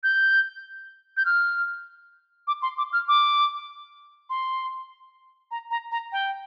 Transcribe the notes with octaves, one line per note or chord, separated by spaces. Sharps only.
G6
G6
F6
D6
C6
D6
F6
D6
C6
A#5
A#5
A#5
G5